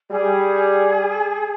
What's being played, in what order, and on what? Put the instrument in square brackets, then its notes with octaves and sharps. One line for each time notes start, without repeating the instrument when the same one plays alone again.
[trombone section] G3 [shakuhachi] G#4